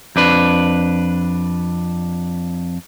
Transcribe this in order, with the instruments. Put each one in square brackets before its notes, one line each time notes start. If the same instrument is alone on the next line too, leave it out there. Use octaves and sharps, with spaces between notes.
[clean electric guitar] F2 D4 B4